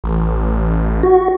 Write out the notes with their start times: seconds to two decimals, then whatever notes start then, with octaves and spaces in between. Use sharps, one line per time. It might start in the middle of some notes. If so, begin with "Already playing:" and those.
0.04 A1
1.03 F#4